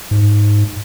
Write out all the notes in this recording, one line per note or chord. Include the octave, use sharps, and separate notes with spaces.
G#2